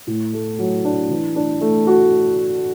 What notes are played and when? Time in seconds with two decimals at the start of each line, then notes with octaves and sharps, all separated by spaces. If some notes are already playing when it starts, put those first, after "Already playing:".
0.07 A2
0.33 A3
0.59 F#3
0.85 D4
1.11 E3
1.36 D4
1.61 A3
1.87 F#4